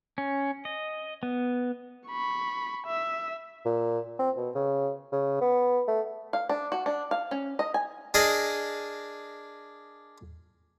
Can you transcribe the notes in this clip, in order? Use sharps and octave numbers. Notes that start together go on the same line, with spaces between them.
C#4
D#5
B3
B5 C#6
E5
A#2
C4
B2
C#3
C#3
B3
A3
F5
D4
F#4
D4
F5
C#4
D#5
G#5
D4 G#4 A#4 D5 D#5